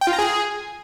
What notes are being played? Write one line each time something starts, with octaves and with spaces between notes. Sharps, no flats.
G5
F4
A#5
G#4